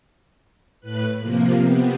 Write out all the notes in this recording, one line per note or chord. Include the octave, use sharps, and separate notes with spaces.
A2 B4 F#6
C3 F3 A#3
C3 B3